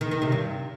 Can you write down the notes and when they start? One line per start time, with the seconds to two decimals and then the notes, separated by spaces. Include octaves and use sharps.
0.01 D#3
0.11 D#3
0.22 C3
0.32 G2